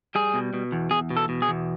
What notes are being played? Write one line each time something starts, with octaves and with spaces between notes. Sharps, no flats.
G3 G#4
B2
B2
E2
E2 G#4
B2
A4
B2
G#4
E2